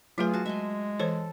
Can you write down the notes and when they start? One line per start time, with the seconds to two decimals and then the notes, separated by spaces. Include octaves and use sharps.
0.18 F#3 A3 F4 G#4 B4
0.33 F#4 A5
0.46 G#3 E5 G#5 C6
0.99 E3 A4 C5 C#5